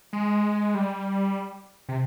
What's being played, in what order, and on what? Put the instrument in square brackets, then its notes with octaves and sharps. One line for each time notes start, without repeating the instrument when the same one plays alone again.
[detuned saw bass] G#3
G3
C3